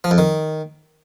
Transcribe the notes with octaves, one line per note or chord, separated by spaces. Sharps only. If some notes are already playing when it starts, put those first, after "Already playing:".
F3
F2
D#3